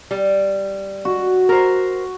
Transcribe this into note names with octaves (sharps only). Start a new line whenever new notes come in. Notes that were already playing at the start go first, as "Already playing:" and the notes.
G3
F#4
A#4 C5